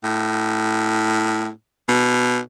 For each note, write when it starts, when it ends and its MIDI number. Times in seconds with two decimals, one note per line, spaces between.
0.04 1.49 45
1.88 2.38 47